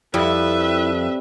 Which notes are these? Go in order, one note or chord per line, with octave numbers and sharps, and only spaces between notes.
F2 G3 E4 B4 E5